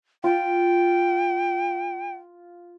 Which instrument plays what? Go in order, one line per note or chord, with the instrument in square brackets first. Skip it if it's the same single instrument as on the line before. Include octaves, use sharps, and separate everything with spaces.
[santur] F4 [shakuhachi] G5